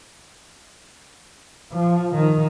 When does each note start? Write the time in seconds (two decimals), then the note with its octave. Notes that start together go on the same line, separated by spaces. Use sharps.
1.72 F3
2.15 D#3